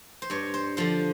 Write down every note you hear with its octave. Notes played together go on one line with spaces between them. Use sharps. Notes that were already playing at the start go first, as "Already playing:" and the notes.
C5
G2 C#5
C5
D3 F3 C5